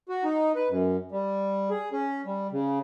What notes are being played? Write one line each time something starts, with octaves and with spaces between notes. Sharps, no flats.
F#4
D#4
B4
F#2
G3
G#4
C#4
G3
C#3